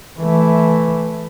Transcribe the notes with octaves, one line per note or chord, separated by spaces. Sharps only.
E3 A3